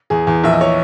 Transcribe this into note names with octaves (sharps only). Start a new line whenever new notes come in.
E2 G#4
E2
A#1 E5
D#5
C#5